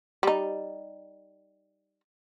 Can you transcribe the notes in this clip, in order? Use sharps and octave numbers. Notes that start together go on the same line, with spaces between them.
G3 D#4